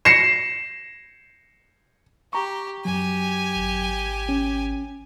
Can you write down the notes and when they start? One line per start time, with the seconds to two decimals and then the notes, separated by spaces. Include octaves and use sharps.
0.05 A#6 C7 C#7 E7
2.33 G4 A#5 C#6
2.85 F#2 F#3 G4 G#5
3.55 G#1
4.29 C#4